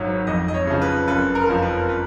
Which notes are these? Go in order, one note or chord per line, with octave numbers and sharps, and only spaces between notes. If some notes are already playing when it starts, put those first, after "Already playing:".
Already playing: G#1 G#2 F#3 C#5
F2 D#5
D#5
C#5
C#3 F3
B4
F#1 B4
A#4
F2 F3
B4
B4